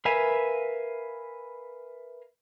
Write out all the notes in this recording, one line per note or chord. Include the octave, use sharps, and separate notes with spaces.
A#4 B4 E5 F5 G#5